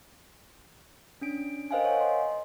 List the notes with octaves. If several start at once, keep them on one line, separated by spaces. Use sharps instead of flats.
C#4 D4 D7
A#4 C5 D#5 F5 G5 G#5
A#4 C#5 F5 F#5 G#5
D#5 C6